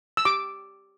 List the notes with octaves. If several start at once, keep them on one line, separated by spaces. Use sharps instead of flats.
E6
G4 D6